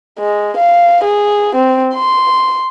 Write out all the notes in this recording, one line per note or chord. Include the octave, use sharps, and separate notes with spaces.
G#3
F5
G#4
C4
C6